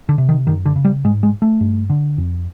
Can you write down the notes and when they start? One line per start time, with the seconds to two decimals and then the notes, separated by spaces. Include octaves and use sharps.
0.09 D3
0.18 C3
0.29 D#3
0.47 F#2 D#3
0.66 D3
0.76 C#3
0.85 G3
1.04 G#2 G#3
1.23 G#3
1.42 A3
1.61 G2
1.90 D3
2.18 F2